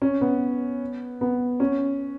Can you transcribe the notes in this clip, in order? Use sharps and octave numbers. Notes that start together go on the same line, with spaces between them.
C#4
B3
B3
C#4